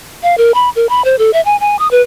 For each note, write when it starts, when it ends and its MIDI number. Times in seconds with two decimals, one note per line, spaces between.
0.23 0.37 77
0.38 0.54 70
0.54 0.69 83
0.76 0.87 70
0.89 1.02 83
1.05 1.16 72
1.19 1.31 69
1.33 1.41 76
1.45 1.56 80
1.60 1.78 80
1.79 1.88 87
1.91 2.02 71